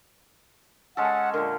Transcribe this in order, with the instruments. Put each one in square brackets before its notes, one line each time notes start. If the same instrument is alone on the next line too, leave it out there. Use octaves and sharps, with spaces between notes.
[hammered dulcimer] G#3 C#4 A4 [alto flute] F#5
[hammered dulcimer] A#2 D3 [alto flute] A#4